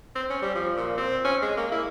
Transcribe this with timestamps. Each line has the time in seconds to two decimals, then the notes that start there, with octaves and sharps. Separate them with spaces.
0.15 C4
0.30 C#4
0.42 G3
0.55 F3
0.76 A#2
0.98 C4
1.25 C#4
1.42 G#3
1.57 A#3
1.72 E4